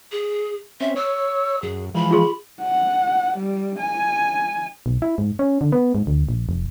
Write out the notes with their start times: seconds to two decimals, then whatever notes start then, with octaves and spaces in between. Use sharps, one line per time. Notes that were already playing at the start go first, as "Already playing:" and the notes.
0.12 G#4
0.80 C4 C#4 E5
0.96 C#5 E6
1.62 F#2 G#4
1.94 E3 F3 G#3 B5
2.11 F4 G#4 C6
2.62 F#5
3.37 G3
3.79 G#5
4.86 B1
5.02 E4
5.18 G#2
5.39 C#4
5.61 D3
5.72 B3
5.95 G#2
6.07 D2
6.29 A#1
6.49 F1